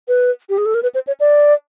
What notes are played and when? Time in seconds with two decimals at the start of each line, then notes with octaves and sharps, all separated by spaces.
0.08 B4
0.49 G4
0.58 G#4
0.66 A4
0.74 A#4
0.83 B4
0.95 C5
1.07 C#5
1.20 D5